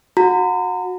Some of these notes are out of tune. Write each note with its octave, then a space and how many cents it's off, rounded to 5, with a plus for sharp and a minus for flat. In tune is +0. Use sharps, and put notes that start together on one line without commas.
F#4 -25 A#5 -25